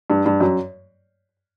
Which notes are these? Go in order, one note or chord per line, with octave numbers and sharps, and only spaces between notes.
G2
G2
F#2